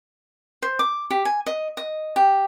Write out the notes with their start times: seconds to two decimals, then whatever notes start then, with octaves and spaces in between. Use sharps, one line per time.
0.62 C5
0.79 D6
1.10 G4
1.25 G#5
1.46 D#5
1.77 D#5
2.16 G4